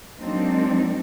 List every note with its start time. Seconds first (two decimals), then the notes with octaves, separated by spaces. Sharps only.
0.18 F#3 G#3 A#3 C4 D4 D#4